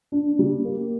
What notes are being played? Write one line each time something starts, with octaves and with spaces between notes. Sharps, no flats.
D4
G3
A#3